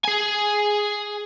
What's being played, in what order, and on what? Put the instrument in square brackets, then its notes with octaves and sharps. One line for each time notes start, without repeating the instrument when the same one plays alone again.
[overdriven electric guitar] G#4 G#5